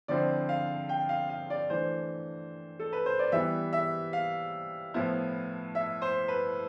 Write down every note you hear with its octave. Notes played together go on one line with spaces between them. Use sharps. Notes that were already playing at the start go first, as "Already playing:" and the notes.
D3 F3 C4 E4 D5
F5
G5
F5
F5
D5
E3 A3 D4 C5
A4
B4
C5
D5
E3 G3 B3 E5
E5
F5
A2 F3 B3 E4
E5
C5
B4